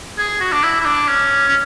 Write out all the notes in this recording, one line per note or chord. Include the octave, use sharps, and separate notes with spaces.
G#4
F#4
D4
E4
E4
D4
C#4
C#4